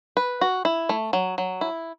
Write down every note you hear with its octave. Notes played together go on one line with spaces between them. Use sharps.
B4
F#4
E4
A3
F#3
F#3
E4